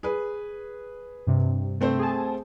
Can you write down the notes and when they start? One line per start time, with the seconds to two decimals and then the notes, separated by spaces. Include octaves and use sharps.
0.03 G#4 B4
1.27 G2 C3
1.81 A3 C4 C5
1.99 G#4 G#5 A5